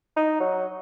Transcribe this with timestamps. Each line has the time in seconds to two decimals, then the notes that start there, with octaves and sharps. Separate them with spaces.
0.16 D#4
0.40 F#3